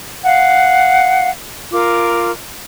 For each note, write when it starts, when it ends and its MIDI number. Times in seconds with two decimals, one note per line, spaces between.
0.24 1.30 77
0.24 1.30 78
1.72 2.31 65
1.72 2.31 70
1.72 2.31 86